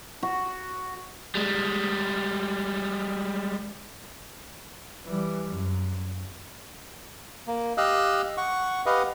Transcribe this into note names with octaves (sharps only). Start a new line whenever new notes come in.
F#4
G3 G#3
E3 G3
F#2
A#3
G4 D#5 F5 E6 F#6
F#5 C#6
G4 B4 D#5 F5 F#5